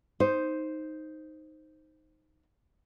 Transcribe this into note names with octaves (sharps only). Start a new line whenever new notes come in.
D#4 C5